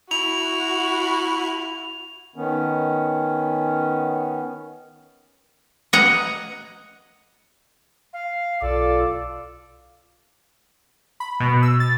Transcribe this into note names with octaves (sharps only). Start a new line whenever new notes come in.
E4 F#4 F7
D#3 B3 C#4
D#5 F#5 A#5
F5
B1 F4 A4 D5
B5
B2
E6
A6